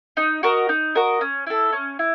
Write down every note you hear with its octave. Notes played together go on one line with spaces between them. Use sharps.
D#4
F#4 A#4 D#5
D#4
F#4 A#4 D#5
C#4
E4 A4
C#4
E4